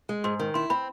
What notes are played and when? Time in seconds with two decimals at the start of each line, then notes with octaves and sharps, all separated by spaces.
0.09 G#3
0.24 G#2 C6
0.39 D#3
0.54 E4 C6
0.70 C4 B5